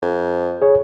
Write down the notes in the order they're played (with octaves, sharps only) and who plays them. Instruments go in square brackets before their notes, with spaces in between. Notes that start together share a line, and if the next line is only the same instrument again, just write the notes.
[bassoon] F2
[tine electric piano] G#4 C#5